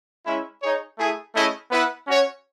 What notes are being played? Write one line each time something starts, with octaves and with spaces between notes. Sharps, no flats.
G#3 C#4 E4
D#4 G#4 C#5
A3 E4 G#4
A3 C#4 E4 G#4 D#5
B3 E4 B4 F#5
C#4 F#4 C#5